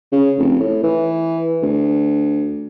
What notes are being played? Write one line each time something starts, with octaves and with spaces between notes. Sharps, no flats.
C#3
F1
A2
E3
D2